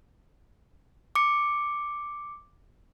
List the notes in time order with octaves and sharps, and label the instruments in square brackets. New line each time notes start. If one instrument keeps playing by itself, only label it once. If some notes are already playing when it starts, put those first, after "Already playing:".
[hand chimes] D6 C#7